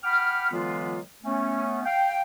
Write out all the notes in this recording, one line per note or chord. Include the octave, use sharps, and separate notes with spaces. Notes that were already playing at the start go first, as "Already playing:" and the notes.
F#5 G5 B5 D6 F6
D3 E3 F#3 G#3 B3 F4
A3 B3 C#4
F5 G5